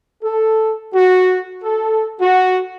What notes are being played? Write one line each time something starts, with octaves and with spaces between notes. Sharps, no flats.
A4
F#4
A4
F#4